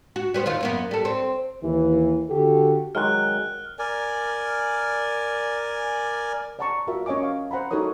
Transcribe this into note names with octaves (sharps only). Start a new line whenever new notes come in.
F#4
G3 B3 C5
D#2 D#3 F4
F#2 A#3 B3
G3 A4
C4
D#2 E3
D3 F#4 G4 A4
D#3 F#3 G#3 F6 F#6
A#4 D5 G#5
D5 F#5 A5 A#5 C#6
F4 F#4 A#4 E5
C#4 C#5 D#5 G#5 D6
F5
C5 F#5 A#5 B5
D#4 F#4 A4 A#4 C#5 D#6